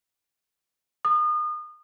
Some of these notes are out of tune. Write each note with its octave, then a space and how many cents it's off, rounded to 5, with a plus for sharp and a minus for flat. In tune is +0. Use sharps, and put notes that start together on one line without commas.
D#6 -35